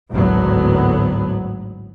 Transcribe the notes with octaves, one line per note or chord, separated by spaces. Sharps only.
G#1 D2 A2 F#3 B3